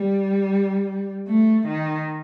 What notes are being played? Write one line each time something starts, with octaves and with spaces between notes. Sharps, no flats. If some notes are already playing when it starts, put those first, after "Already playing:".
Already playing: G3
A3
D#3